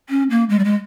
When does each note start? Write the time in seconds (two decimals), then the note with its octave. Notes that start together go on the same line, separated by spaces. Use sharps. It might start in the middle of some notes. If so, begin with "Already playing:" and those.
0.09 C#4
0.30 A#3
0.49 G#3
0.59 G3
0.64 G#3